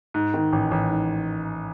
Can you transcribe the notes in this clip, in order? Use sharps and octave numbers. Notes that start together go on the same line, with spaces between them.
G#2
D#3
A1
A1
G#2